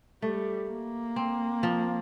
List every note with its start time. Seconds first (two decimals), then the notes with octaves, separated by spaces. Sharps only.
0.22 G3 A3
0.70 A#3
1.16 C4
1.63 F3